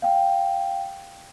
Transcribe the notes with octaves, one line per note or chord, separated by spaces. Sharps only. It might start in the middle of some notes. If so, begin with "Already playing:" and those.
F5 G5